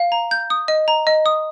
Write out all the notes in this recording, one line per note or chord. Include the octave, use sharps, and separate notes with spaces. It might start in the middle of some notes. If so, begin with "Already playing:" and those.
Already playing: F5
A#5
G6
D#6
D#5
A#5
D#5
D#6